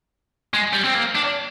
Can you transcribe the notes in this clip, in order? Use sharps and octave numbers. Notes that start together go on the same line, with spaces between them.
G#3
G3
C4
A#3
D4